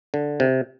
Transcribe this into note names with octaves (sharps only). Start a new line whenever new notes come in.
D3
C3